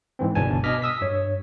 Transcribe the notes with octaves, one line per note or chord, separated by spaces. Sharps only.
G#2 E3 C4
G1 C2 B2 D4 G#5 A5
B2 D#5 D6 F6 A#6 B6
D#6 E6 B6
G2 C#5